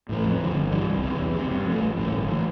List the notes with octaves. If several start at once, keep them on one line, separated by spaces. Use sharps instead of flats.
A2 E3 A3
F2
D3 F3
G1
G2 E3 G3
C2
C3 E3
E2
C3 G3 C4
G2
F3 A3
A1
A2 E3 A#3
G1
E3 A3